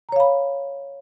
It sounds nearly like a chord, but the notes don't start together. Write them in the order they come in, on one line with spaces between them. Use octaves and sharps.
A#5 C#5 F5 B5